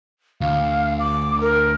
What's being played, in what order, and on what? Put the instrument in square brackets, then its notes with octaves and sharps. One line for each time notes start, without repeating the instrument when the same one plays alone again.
[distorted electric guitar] D2 [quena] F5
[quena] D6
A#4